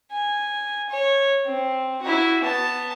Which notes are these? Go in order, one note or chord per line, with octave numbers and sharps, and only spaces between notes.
G#5
C#5
C4
E4 F#4
B3 A5